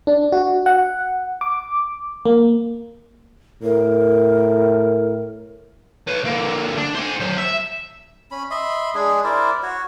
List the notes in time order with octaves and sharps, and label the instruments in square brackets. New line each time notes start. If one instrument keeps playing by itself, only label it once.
[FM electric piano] D4
F#4
F#5
D6
A#3
[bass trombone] A2 [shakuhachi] A#4
[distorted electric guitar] B4 C#5
D3 A#3
D4
C5 G#5
F#3 C5
E5
[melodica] C#4 B5
D#5 E5 B5 C6
G#3 D4 G#4
E4 A#4 C5 D5
F#4 C#5